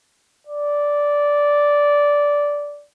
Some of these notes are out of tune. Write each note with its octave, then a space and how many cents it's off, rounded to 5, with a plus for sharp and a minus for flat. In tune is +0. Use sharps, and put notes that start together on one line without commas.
D5 -10